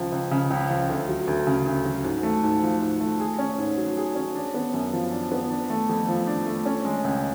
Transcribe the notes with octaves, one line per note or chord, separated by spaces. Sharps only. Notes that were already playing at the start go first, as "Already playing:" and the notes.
Already playing: C#2 F3
C#2
C#3
C#2
F3
D2
F#3
D2
C#3
D2
F#3
G#2
A3
G#2
F3
G#2
A3
G#4
C#4
G#2
F#3
G#4
C#4
D4
B3
F#2
F3
D4
B3
D4
A3
F2
F3
D4
A3
C#4
G#3
C#2